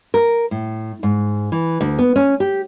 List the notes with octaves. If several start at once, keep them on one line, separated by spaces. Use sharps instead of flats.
A#4
A2
G#2
E3
D2
B3
C#4
G4